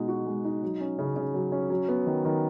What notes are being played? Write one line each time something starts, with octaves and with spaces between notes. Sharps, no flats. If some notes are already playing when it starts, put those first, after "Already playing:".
Already playing: B2 G#3 D#4
F#4
G#3
D#4
F#3
C#4
C#3
C#3
F#3
C#4
F#3
B3
D#3
D#3